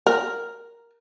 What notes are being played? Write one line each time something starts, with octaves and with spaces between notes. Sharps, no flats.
A#4